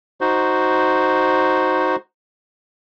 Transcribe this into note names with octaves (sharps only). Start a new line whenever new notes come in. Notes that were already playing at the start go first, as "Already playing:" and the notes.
D#4 F#4 C5